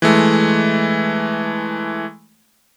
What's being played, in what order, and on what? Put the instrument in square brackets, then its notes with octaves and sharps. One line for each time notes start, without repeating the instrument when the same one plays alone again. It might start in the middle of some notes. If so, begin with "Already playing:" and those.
[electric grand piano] E3 G#3 A3